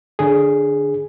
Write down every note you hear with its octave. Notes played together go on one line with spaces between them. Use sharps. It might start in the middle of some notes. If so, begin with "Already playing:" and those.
D3 G#4